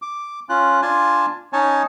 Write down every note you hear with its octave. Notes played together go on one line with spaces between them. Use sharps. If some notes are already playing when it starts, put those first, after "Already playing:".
D6
C#4 F4 F#6
D4 F4 G#5 A5
C#4 D#4 C#5 G#5 A5